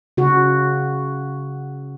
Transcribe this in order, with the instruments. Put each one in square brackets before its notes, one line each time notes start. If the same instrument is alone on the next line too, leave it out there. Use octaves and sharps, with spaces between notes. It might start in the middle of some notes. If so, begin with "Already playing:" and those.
[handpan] C#3 F#4